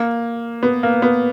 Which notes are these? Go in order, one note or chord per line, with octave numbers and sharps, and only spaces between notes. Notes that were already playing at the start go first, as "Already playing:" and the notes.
Already playing: A#3
B3
A#3
B3